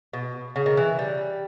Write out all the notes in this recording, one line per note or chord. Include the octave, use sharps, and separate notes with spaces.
B2
C#3
D#3
E3
G3